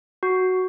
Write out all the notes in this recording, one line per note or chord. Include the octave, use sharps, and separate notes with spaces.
F#4